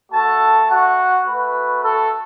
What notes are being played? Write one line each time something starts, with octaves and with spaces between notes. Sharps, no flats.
A3 F#4 A4 A5
F#4 F#5
A3 F#4 B4
A4